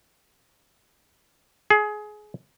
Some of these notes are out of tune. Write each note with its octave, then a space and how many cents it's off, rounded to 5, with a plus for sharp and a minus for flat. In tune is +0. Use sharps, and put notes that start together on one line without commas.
G#4 +20